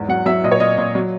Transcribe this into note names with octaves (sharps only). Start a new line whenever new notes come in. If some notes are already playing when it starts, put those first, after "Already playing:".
Already playing: E2 G#2
F#3 F#5
F#3 E5
A#2 D#5
C#5
A#2 D#5
A#2
F#3